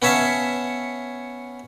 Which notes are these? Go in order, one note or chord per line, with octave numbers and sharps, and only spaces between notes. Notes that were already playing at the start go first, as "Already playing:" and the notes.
B3 C#4 C#5 E5 F5 A5